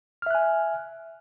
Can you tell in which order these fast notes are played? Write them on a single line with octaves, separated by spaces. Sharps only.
F6 E5 F#6 G#5